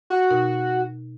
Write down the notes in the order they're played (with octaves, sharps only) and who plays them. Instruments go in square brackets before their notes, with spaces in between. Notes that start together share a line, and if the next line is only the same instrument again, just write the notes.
[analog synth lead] F#4
[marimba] B2 D#4 A#4